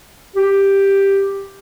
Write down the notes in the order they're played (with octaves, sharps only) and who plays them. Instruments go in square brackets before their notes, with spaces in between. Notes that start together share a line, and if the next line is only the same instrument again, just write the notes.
[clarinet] G4